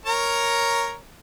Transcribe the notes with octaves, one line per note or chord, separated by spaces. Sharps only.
A#4 C#5 A#5